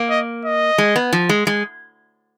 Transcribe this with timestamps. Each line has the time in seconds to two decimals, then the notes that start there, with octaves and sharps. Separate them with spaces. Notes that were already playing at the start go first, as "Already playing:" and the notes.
Already playing: A#3
0.10 D#5
0.45 D#5
0.78 G#3
0.96 B3
1.13 F3
1.29 G#3
1.47 G#3